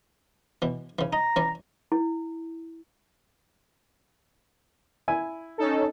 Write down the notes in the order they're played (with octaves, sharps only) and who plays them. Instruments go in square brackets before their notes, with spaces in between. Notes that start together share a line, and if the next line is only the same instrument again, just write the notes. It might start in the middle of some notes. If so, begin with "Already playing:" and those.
[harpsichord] B2 E3
C#3 E3
[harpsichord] D#4 [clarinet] A#5
[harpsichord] E3 C#4 D5
[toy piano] E4
[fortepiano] E4 G#5
[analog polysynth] C#4 D#4 A4